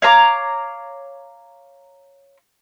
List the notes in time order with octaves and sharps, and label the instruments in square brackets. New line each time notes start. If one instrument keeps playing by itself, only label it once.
[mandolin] C#5 F5 A#5 D6